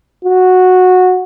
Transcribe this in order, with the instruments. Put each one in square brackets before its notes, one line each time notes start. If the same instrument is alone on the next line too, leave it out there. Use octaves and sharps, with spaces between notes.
[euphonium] F#4